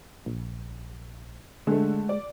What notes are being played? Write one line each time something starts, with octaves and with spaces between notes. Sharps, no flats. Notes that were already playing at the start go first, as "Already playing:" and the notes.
A#1
D3 G#3 A3
D5